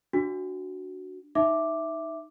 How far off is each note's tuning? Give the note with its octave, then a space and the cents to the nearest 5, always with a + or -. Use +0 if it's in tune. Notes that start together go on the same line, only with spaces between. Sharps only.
D4 +0 F#4 +0
D#4 +0 E5 +0 D6 +0